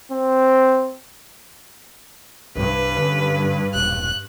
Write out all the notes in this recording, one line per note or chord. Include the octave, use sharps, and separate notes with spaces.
C4
C2 G2 B4
D3 C#4
E1 A#1 F#6